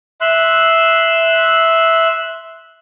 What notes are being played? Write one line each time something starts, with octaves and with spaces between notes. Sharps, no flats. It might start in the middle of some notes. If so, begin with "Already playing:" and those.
E5 C6 F#6